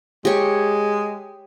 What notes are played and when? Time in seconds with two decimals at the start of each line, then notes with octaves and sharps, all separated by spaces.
0.25 G#3 G4 C#5